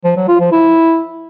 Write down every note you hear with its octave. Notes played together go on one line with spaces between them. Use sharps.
F3
F#3
F4
F3
E4